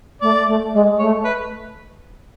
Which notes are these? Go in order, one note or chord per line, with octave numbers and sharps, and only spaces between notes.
A3 D5
A3
G#3
A3 C#5
B4